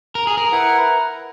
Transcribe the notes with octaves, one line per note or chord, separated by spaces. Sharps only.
A#4
G#4
A#4
E4 B4 F#5